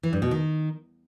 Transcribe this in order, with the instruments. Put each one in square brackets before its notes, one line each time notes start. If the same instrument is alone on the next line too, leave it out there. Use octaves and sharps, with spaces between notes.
[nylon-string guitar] E3
G2
B2
D#3